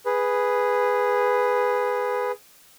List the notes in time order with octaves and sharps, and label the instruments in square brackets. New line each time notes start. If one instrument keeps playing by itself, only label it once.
[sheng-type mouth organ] G#4 B4